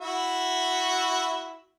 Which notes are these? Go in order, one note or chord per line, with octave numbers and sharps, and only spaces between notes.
E4 F#4 E5